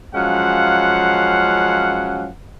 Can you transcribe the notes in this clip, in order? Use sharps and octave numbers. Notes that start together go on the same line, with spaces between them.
F#2 F3 G#3 C#4 F5 F#5